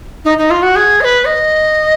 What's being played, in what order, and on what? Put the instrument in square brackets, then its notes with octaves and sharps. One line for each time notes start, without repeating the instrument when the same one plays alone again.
[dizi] D#4
D#4
F4
F#4
G#4
D#5
B4
D#5